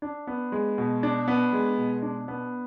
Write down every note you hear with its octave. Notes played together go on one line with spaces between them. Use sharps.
D4
B3
G#3
B2
D4
B3
G#3
B2
D4
B3